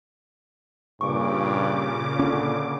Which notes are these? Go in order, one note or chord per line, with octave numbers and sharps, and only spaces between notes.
G2 A#2 C#3 C#6 D6
D3 C#4